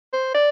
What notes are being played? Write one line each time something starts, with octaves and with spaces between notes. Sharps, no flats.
C5
D5